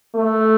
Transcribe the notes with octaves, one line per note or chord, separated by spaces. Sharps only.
A3